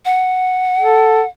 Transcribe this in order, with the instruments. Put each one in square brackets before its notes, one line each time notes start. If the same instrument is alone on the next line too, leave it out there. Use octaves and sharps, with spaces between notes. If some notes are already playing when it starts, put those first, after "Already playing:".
[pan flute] F#5
[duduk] A4